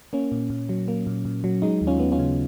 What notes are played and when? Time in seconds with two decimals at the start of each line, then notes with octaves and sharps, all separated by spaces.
0.13 A#3 C#4
0.32 A#2
0.50 A#2
0.69 F#3
0.88 A#3
1.07 A#2
1.25 A#2
1.44 F#3
1.62 G#3 D#4
1.81 D#2
1.87 C#4 F4
2.00 B3
2.12 C#4 F4
2.19 C#3